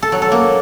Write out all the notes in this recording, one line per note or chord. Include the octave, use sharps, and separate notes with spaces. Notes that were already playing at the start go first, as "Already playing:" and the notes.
A4
F#3
A4
A#3